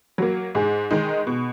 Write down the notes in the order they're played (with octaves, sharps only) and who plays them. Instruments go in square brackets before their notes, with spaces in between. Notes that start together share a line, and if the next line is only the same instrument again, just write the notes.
[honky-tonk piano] F#3 A#3
[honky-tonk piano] G#2 [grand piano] G#4
[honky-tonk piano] D#3 G#3 D#4
B2